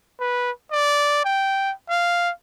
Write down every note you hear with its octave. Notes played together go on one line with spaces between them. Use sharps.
B4
D5
G5
F5